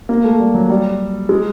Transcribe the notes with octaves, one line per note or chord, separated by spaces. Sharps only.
A#3
A3
G3
F#3
G3
G#3